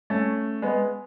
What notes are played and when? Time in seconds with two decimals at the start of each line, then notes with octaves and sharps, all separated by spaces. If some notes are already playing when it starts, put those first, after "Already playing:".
0.10 A3 C#4
0.62 G#3 B3